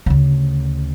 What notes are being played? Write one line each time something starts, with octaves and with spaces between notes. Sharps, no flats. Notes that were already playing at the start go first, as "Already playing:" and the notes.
D2 C#3